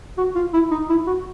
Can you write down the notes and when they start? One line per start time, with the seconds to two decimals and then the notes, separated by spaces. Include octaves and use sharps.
0.18 F#4
0.35 F4
0.53 E4
0.71 D#4
0.89 E4
1.07 F#4